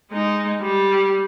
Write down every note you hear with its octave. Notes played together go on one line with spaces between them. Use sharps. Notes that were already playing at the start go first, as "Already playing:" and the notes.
G#3 D#4
G3